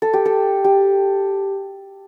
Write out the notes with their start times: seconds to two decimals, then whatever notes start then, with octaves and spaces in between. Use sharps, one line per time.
0.02 A4
0.13 G4
0.25 A4
0.64 G4